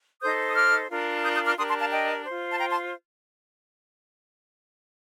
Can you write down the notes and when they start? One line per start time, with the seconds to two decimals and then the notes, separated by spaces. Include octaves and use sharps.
0.21 D#4 A4 C5 D#6 G6
0.48 D#6
0.55 D6 F6
0.90 D4 F4 A#4
1.23 D#6 G6
1.35 D#6 G6
1.46 D6 F6
1.58 D4 G4 A#4 C6 D#6
1.69 A5 C6
1.81 F5 A5
1.91 D#5 G5
2.26 F4 C5
2.51 A5
2.60 G5 A#5
2.71 A5 C6